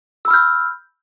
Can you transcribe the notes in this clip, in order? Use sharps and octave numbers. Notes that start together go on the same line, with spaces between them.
B5 E6 F6 G6